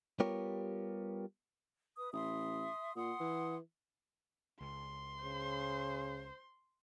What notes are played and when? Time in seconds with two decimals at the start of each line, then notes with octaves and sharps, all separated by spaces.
0.20 G3 B3 F4 G4 A#4 C#5
1.97 B4 D#6
2.13 A1 E5 C6 D#6
2.96 A#2 F#5 C6 D#6
3.20 E3
4.61 C#2 C6
5.24 C#3 C5